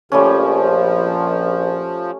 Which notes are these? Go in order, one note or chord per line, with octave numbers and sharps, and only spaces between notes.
A#1 F3 G3 A3 C#4